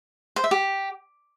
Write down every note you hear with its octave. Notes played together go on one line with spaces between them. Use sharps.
C5
E5
G4